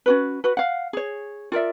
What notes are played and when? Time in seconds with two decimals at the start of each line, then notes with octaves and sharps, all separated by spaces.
0.06 C#4 F#4 B4
0.44 F#4 B4
0.57 F5 F#5
0.93 G#4 C#5
1.52 F4 A#4 D5 E5